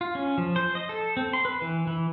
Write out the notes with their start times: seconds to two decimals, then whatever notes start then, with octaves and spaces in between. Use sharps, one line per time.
0.01 F4
0.15 C#4
0.38 F3
0.56 C5
0.75 D#5
0.89 A4
1.17 C4
1.33 C6
1.45 B4
1.62 E3
1.87 E3